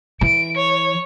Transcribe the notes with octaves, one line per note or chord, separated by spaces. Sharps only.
E3 D7
C#5